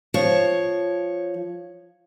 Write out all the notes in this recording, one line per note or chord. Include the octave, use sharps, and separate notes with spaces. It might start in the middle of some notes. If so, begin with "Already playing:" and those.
F3 C#5